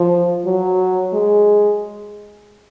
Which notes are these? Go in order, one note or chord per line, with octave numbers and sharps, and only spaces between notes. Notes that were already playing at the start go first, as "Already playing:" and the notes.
Already playing: F3
F#3
G#3